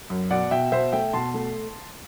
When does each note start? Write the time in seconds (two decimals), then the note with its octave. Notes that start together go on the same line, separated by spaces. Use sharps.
0.10 F#2
0.30 B2 D5 F#5
0.51 B2 E5 G5
0.72 B2 C5 E5
0.92 A3 E5 G5
1.13 B2 A5 C6
1.34 A3